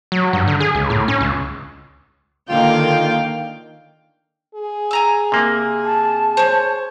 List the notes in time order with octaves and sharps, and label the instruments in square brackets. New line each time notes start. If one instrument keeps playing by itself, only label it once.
[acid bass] F#3
G2
D3
G#4
C#2
A2
C#4
C#2
[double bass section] D3 D#3 A#3 [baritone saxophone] F4 [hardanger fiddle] F5 G5
[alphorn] G#4
[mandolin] G#5 A#5 E6
[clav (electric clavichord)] C3 A#3
[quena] A5
[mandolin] C5 C#5